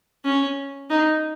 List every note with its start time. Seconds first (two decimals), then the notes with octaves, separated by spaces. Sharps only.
0.25 C#4
0.90 D#4